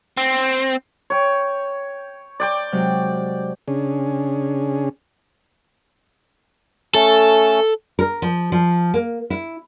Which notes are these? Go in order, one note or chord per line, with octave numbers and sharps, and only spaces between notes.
C4
C#5 G5
D5 G5 D6
C3 F#3 G#3
C#3 C#4 D4 G#4
A3 C#4 A4
A#4
F3
F3
A#3
E4